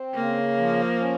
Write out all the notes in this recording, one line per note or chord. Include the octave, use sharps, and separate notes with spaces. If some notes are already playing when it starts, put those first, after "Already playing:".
Already playing: C4
C#3 A#3
F3
C#4